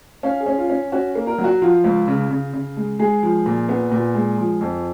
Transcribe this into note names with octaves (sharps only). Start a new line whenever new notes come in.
C#4 F5
G#4
C#4
F4
C#4
C#4 F#4
A#3
A#4
F#3
F#4
F3 F4
C#2
C#3
C#3
C#3
G#3
G#3 G#4
F3
A#2
B3
A#2
G#3
F3
F2